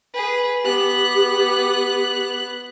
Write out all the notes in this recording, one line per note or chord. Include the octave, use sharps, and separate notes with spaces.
G#4 B4
B3 G4 F#6